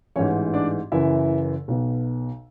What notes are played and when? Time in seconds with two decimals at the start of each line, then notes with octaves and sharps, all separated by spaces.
0.16 A1 G#2 E3 C#4 C#5
0.54 D4 D5
0.92 F#1 F#2 E3 E4 E5
1.68 B1 B2